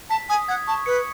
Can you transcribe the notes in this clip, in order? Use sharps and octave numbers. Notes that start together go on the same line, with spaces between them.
A5 B6
G#5 D#6
F#5 G#6
A5 C#6
B4 C#7